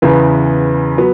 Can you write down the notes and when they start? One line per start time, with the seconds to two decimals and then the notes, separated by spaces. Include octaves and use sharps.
0.02 E2 C#3 E3 B3
0.98 F#3 B3